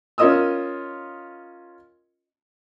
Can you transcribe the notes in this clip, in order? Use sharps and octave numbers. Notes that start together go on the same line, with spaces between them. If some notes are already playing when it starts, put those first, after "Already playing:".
C#4 F4 A#4 D#5 D#6 E6